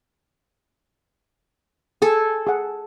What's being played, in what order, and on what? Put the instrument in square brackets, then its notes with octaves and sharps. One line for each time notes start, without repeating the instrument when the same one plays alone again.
[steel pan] G#4 [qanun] A4 G#5
[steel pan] G#4 F#5